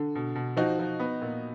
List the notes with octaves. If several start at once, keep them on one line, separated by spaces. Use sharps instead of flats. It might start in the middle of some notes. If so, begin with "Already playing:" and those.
Already playing: D3
B2
B2
F3 D#4 F#4
F3
B3
A#2